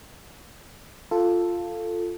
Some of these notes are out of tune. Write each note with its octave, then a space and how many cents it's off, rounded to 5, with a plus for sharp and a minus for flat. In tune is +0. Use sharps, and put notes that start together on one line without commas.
F4 +0 A4 +5